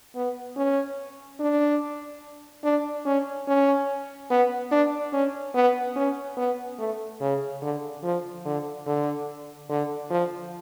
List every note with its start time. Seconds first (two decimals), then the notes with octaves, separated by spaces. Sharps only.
0.15 B3
0.57 C#4
1.40 D4
2.64 D4
3.05 C#4
3.48 C#4
4.30 B3
4.71 D4
5.13 C#4
5.55 B3
5.96 C#4
6.37 B3
6.79 A3
7.21 C#3
7.62 D3
8.03 F3
8.45 D3
8.87 D3
9.70 D3
10.10 F3